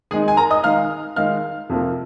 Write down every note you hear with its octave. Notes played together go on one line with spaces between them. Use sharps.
D#3 G#3 D#4 G#4 G#5
G#5
A#4 A#5
D#5 D#6
D#3 G#3 D#4 F5 F6
D#3 G#3 D#4 F5 F6
F2 C3 F3 A#3